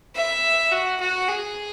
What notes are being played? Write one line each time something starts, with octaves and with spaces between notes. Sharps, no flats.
E5
F#4
F#4
G#4